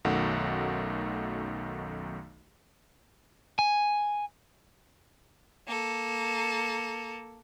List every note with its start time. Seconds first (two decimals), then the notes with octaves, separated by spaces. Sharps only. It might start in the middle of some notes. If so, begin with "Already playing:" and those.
0.05 B1 F#2 D#3 A3 F#4 F#5
3.59 G#5
5.67 A#3 A4